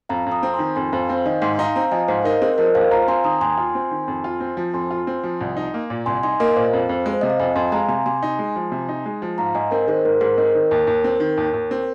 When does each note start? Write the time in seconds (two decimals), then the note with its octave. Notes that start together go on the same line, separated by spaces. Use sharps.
0.09 F2 F5 A#5
0.26 F2
0.32 A#5 D#6
0.43 C4
0.54 D#3 G#5 C6
0.76 F2 G#5 C6
0.93 F2 C5 F5
1.09 C4 C5 F5
1.26 D#3 D#5 G#5
1.42 G#2 G#5 C6
1.59 D#4 F5 A#5
1.76 C4 F5 A#5
1.91 F3 D#5 G#5
2.08 G#2 C5 F5
2.25 D#4 A#4 D#5
2.42 C4 G#4 C5
2.58 F3 A#4 D#5
2.75 D#2 C5 F5
2.91 F4 F5 A#5
3.08 C4 G#5 C6
3.24 D#3 A#5 D#6
3.41 D#2 G#5 C6
3.58 F4
3.75 C4
3.91 D#3
4.08 F2
4.24 F4
4.40 C4
4.57 F3
4.73 F2 G#5 C6
4.91 F4
5.07 C4
5.24 F3
5.41 C2
5.57 D#4
5.74 A#3
5.90 A#2
6.06 C2 G#5 C6
6.23 D#4 G#5 C6
6.40 A#3 A#4 D#5
6.56 A#2 C5 F5
6.73 F2
6.89 F2
7.06 G#3
7.13 C5
7.21 C3 D#5
7.30 F5
7.40 F2 D#5 G#5
7.55 F2 G#5 C6
7.72 G#3 F5 A#5
7.88 C3 G#5 C6
8.06 C3 G#5 C6
8.23 D#4
8.39 G#3
8.56 F3
8.72 C3
8.89 D#4
9.06 G#3
9.22 F3
9.38 G#2 F5 A#5
9.55 G#2 D#5 G#5
9.71 C4 A#4 D#5
9.87 D#3 G#4 C5
10.05 G#2 A#4
10.21 G#2 G#4 C5
10.37 C4 A#4 D#5
10.55 D#3
10.71 D#2 A#4
10.87 D#2
11.04 C4
11.20 D#3
11.37 D#2
11.53 D#2
11.71 C4